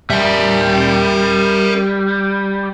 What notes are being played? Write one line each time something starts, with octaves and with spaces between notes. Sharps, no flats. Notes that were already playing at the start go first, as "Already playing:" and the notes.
G3 A#4 E5